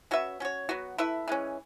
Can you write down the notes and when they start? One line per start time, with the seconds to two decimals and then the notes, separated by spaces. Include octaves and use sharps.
0.11 C#4 F#4 B4 E5
0.40 C#4 F#4 C#5
0.69 F#3 B3 F#4
0.98 A3 E4 B4 E5
1.28 E3 G#3 C#4